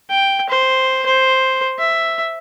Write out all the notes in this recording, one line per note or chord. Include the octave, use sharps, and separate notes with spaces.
G5
C5
C5
E5